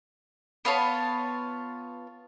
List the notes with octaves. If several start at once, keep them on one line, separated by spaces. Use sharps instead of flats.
B3 F4 C#5 A5